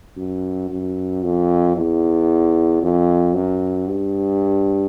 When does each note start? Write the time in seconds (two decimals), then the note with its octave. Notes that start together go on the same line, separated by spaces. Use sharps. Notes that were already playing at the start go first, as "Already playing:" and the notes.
0.17 F#2
0.70 F#2
1.23 F2
1.76 E2
2.82 F2
3.34 F#2
3.88 G2